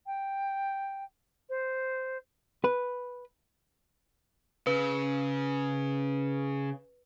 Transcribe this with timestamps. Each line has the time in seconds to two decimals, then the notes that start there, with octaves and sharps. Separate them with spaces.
0.06 G5
1.50 C5
2.64 B4
4.67 C#3 B4